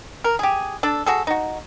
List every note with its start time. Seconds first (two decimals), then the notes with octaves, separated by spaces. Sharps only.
0.24 A#4
0.39 G4 G#4
0.83 D4 A4
1.06 F#4 G#4 A4
1.27 D#4 F#4